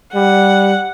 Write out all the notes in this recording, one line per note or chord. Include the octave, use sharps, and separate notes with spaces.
G3 F#5